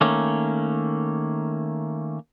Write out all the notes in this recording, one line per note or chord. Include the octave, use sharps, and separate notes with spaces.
D#3 A3 A#3 C#4